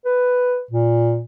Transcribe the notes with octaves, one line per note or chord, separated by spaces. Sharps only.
B4
A#2